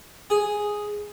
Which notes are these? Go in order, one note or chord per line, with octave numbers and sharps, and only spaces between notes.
G#4